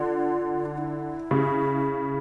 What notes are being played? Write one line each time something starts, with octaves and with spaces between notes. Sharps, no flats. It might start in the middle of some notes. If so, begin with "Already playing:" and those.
Already playing: D3 F4
D4
E4
C#3